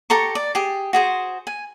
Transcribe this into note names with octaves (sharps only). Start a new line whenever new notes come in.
G4 A4 A#5 C#6
D5
G4 G#4
F#4 G#4 C5
G#5